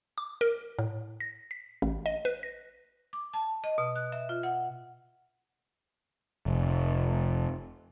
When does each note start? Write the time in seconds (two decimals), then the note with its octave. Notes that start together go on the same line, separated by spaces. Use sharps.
0.18 D6
0.41 A#4
0.79 A2
1.20 A#6
1.51 B6
1.82 A1
2.06 D#5
2.25 B4
2.43 A#6
3.13 D6
3.34 A5
3.64 D#5
3.78 B2
3.96 F#6
4.12 E5
4.29 F4
4.43 F#5
6.46 F1